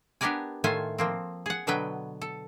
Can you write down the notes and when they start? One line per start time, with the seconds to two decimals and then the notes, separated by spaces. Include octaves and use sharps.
0.21 B3 D4 G4 A#4 D5 G#5
0.64 A2 D#3 A3 F4 C5 G#5
0.98 F3 A#3 C4
1.46 G#4 F#5
1.67 B2 D3 F#3 B3 B4 G5
2.22 A4